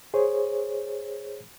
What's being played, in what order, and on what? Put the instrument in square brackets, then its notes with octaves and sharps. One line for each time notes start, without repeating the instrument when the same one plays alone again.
[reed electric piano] G#4 C5 C#5